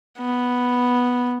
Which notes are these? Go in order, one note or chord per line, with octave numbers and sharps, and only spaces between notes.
B3